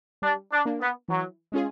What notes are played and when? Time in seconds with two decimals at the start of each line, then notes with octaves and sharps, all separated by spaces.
0.22 G3 D4
0.51 D4
0.65 A#3 D4
0.80 B3
1.08 E3 F#3
1.52 G#3 C#4 F4 G#4